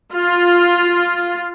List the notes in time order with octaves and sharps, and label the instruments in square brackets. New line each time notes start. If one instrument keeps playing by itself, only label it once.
[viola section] F4